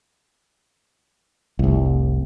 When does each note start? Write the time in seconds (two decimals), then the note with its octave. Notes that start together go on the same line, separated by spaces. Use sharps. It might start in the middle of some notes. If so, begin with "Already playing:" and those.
1.59 F1 C2